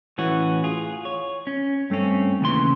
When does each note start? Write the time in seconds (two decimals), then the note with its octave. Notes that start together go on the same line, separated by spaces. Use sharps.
0.18 A2 E3 C#4 F#4
0.64 F4 G#4
1.05 C#5
1.47 C#4
1.90 G2 A3 C4 C#4
2.41 D#2 C#3 E3 C6